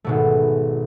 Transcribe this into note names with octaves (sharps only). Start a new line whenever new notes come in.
G#1 B2 A3